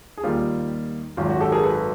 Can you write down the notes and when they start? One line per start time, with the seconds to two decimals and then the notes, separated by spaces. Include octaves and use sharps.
0.17 G#4
0.23 D#2 D#3 G3 A#3 F4 G4
1.17 G#1 F#2 D#3 F4
1.29 F#4
1.41 G4 A4
1.52 G#4 A#4
1.64 A4 B4